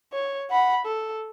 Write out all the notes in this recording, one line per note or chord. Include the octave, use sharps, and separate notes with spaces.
C#5
F#5 B5
A4